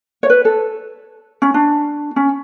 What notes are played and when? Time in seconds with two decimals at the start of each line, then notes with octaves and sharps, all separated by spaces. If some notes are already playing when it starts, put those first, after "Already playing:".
0.23 C#5
0.30 B4
0.45 A4
1.42 C#4
1.54 D4
2.16 C#4